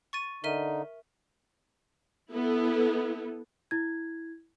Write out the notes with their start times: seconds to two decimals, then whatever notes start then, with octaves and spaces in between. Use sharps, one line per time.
0.13 C#6 A6 D#7
0.44 D3 D#4 A#4 E5 D#7
2.31 B3 E4 A4
3.71 E4 G#6